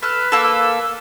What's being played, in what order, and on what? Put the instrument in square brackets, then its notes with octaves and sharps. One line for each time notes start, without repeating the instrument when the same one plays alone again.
[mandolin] A4 F#6 [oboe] B4 [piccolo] F6
[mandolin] A#3 A4 [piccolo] E6